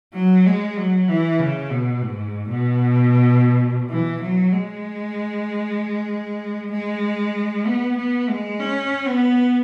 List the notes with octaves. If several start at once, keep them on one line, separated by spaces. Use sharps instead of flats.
F#3
G#3
F#3
E3
C#3
B2
G#2
B2
E3
F#3
G#3
G#3
B3
B3
G#3
C#4
B3